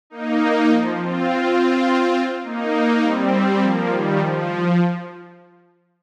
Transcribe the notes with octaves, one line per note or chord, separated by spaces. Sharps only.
A#3 D#4
F3
C4 F4
A#3 D#4
G3 C4
F3 A#3
D#3 G3
F3